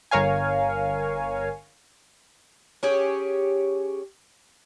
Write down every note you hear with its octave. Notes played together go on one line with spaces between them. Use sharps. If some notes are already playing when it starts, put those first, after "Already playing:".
G1 A#4 C#5 F5 G#5
C#4 G4 G#4